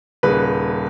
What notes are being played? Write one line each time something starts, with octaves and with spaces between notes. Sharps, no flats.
D#1 C#3 B4